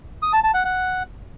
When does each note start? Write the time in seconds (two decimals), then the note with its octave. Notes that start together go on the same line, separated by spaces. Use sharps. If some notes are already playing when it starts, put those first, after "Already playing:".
0.22 D#6
0.33 A5
0.44 A5
0.54 F#5
0.65 F#5